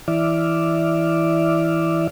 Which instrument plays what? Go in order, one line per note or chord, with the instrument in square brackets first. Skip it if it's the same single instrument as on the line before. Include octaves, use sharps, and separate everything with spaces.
[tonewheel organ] E3 E4 D5 E5 D6 F6